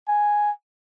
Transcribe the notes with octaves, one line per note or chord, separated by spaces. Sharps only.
G#5